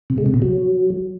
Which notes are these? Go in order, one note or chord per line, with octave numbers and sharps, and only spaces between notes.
C3
G#3
C3
B2
F#3